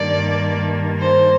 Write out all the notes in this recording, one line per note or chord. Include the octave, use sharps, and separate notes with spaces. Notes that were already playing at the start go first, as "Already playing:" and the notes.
Already playing: G2 D#3 G3 A#3 D5
C5